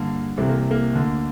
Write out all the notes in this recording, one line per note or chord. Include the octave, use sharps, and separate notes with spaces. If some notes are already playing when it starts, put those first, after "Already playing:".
Already playing: G2 D3 A#3
C2 C3 E3 C4
A#3
A#3
D2 D3